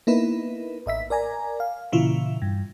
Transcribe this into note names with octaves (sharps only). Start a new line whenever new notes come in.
A#3 B3 D#4 E4 B4
A1 D#5 E5 B6
A#4 D5 G#5 A#5
F5
A#2 C#3 E3 E4 F4
G2